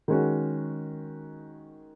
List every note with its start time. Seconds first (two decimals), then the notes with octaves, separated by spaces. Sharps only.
0.08 D#3 G#3 C#4 F#4